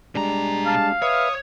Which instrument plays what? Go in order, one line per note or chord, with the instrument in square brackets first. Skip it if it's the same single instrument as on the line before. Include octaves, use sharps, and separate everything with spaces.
[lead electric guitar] B2 A#5 [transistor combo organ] G3 G#3 D4
[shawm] F5 [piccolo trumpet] A5
[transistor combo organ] B4 E5 [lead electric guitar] C#5 [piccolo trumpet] D#6